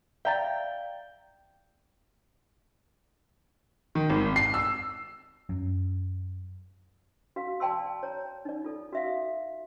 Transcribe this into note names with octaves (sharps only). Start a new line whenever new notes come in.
D5 E5 F5 G5 A#5 A6
D#3
G#1
C7
E6
F#2
F#4 F5
D5 G5 A5 C6 E6
C#5 A#5
D#4 D5
F4 A4
F#4 E5 F5